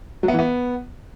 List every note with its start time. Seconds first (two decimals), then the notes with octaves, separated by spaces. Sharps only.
0.23 F#3
0.28 B3
0.33 E3
0.39 B3